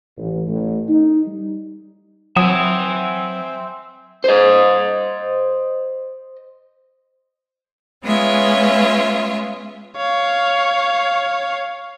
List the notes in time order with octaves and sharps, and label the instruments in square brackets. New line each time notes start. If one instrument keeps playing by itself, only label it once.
[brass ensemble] A1
A1
D#4
G3
[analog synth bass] F#3 [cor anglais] C4 [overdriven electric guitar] E5 G#5 [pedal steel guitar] F#5 D#6
[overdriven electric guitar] C5 D#5
[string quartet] G#3 B3 C#4 F4 E5
[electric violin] C#5 F5